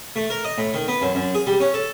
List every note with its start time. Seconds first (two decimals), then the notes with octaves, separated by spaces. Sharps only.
0.16 A3
0.30 A#4
0.45 D#5
0.58 A2
0.74 D#3
0.88 B3
1.02 F#2
1.15 F#2
1.35 G#4
1.47 G3
1.60 C#4
1.74 A4